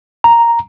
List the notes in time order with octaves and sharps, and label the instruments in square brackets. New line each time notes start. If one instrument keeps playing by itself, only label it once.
[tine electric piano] A#5